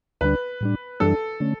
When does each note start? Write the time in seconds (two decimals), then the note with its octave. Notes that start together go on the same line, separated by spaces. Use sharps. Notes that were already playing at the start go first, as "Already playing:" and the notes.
0.21 D2 D3 G3 D4 B4
0.61 A2 G3 D4
1.00 F#2 E3 G3 D4 A4
1.40 D3 A3 C#4